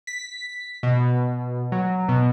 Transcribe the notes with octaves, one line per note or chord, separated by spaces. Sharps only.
B6
B2
F#3
B2